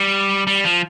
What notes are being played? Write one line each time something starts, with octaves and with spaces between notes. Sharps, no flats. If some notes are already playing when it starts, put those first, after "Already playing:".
Already playing: G3
G3
F3